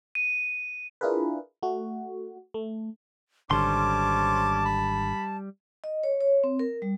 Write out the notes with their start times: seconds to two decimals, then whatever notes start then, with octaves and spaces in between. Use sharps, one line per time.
0.15 D#7
1.01 D4 E4 F4 G#4 A#4 B4
1.63 A3 F#4
2.54 A3
3.51 G#1 D3 G3 C#4 C5 A5 C6 D6
4.66 B5
5.84 D#5
6.04 C#5
6.21 C#5
6.44 C4
6.59 A#4
6.82 G3